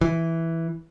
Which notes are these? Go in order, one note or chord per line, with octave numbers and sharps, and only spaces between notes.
E3